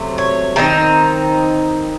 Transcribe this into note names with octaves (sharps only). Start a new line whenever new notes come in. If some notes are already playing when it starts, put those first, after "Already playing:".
Already playing: C3 F#3 A3
C#5
D#3 A3 C4 D#4